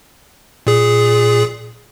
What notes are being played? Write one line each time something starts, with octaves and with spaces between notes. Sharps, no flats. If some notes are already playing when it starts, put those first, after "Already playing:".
A#2 G#4